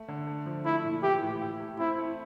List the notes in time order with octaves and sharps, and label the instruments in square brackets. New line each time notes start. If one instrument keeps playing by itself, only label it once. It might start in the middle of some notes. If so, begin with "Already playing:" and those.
Already playing: [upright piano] A3
D3
A3
F3
[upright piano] A3 [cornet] E4
[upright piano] A#2
[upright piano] E3 [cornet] G4
[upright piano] A2
E4
A3
[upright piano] C4 [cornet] E4
[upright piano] A3